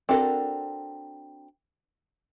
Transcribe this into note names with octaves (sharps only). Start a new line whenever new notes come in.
C4 D4 F#4 A4 A#4